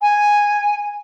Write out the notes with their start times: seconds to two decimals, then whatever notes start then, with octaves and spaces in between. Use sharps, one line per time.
0.02 G#5